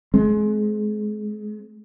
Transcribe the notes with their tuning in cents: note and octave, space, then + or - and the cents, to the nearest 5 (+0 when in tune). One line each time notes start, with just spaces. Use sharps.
G#3 +30 C4 +0